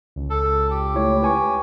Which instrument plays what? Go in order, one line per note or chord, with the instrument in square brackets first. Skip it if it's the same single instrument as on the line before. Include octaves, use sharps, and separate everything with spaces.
[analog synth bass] C#2
[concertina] A4
G4
[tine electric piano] A3 E4 C#5
B4 G#5 C#6